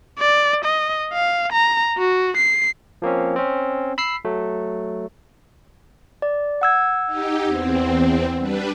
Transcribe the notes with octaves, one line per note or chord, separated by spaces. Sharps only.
D5
D#5
F5
A#5
F#4
C7
F3 A#3 C4 C#4
C4 C#4
B5 E6 B6 C7
F#3 A3
D5
F#5 E6 G#6
D#4 G4
E2 C4
G3 D4 B4